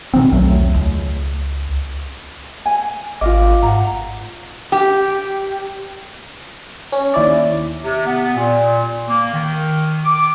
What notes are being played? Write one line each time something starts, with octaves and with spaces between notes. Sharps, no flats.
B2 D#3 C4
B1 E2 F#3 A3
C#2
G#5
G#1 F4 D#5 F5 D6
G#2 F#5 A#5
G4
C#4
D#2 E4 D5
C3
B3
A#2
A#3
D#3
D6